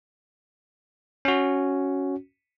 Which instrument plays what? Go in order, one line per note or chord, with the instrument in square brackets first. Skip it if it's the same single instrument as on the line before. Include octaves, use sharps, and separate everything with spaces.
[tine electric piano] C#4 F#4